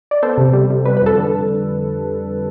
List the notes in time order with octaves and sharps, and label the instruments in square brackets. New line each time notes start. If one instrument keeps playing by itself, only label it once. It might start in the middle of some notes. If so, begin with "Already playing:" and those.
[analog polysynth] D5
B3 A4 C5
C3
G3
C3
G3 B4
B4
F2 A4
D3